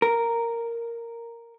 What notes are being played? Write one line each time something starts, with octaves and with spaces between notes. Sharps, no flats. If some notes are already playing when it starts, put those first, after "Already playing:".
A#4